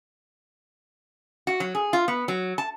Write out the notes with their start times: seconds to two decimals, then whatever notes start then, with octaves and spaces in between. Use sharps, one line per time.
1.47 F#4
1.60 F#3
1.75 G#4
1.93 F4
2.08 B3
2.28 F#3
2.58 A5